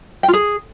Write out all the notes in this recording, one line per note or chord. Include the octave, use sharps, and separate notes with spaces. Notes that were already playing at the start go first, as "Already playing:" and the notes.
G5
F4
G#4